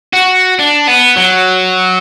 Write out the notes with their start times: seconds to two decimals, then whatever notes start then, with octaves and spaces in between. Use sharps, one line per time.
0.13 F#4
0.59 D4
0.87 B3
1.17 F#3